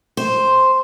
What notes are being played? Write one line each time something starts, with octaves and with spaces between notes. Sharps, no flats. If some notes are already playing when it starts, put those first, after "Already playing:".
C5